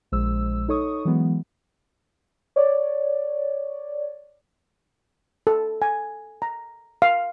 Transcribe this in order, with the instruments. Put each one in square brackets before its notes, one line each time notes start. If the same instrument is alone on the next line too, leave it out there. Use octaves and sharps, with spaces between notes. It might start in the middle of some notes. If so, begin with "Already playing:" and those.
[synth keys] A#1 G#3 C5 E6
D#4 A4 C#5 C#6 D#6
E3 F#3 G#3 B3
C#5 D5
[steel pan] A4
G#5
A#5
F5